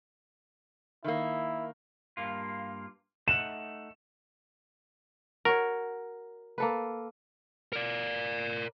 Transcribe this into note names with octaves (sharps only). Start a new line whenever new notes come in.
D#3 A#3 E4
G2 A#3 F4
A3 D#4 F#5 E7
F#4 A#4 C#5
A#3 A4 B4
A#4 D5